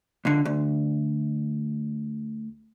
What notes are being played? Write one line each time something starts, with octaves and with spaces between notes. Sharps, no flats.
C#2 D3
D2